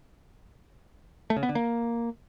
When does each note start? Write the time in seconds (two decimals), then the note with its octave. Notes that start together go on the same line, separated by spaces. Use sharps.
1.30 A3
1.36 C#3
1.43 B3
1.49 D3
1.55 A#3